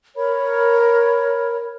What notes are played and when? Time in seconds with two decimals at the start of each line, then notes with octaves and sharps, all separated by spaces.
0.16 A#4 C#5 B5